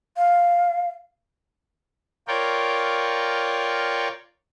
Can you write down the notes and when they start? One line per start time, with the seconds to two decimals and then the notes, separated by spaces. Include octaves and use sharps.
0.17 F5
2.28 F4 A#4 C#5 D5 G5